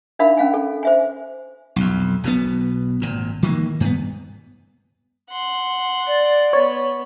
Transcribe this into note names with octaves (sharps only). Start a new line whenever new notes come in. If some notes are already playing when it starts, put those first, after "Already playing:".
D4 D#4 A#4 E5 F5 B5
C#4 F5 G#5
A4
C5 E5 G#5
B1 F2
B1 B2 D#3 B3
G#1 A#2
D#3 E3 A#3
G2 B3
F#5 C6
D5
B3 C#5